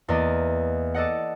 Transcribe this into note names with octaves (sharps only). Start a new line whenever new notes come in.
E2 A#3 D5 D#5
A4 D5 D#5 F#5